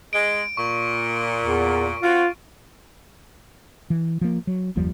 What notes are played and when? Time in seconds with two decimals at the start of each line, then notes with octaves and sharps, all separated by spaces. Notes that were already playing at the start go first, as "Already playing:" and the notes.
0.13 G#3 D7
0.57 A#2 C#6
1.42 E2
2.03 C4 F4 F#4
3.90 E3
4.21 F3 A#3
4.47 F#3
4.76 F#1 D#2 F3 G3